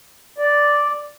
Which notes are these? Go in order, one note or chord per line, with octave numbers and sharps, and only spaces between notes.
D5